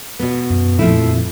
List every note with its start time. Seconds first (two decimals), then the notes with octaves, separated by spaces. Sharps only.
0.19 B2 B3
0.50 F#2
0.79 F2 A#2 F3 A3 C4 E4